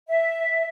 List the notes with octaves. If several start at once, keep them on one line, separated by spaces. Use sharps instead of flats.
E5